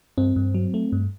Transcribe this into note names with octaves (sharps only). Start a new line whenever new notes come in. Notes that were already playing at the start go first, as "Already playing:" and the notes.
G2 C4
G2
F#3
A3
G2